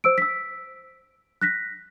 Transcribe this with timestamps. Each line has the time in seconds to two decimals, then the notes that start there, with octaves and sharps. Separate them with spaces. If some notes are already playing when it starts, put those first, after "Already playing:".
0.04 C5 E6 D7
0.18 E6 B6
1.41 F#6 A#6 B6